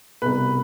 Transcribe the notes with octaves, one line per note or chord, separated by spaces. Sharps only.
C2 B2 B4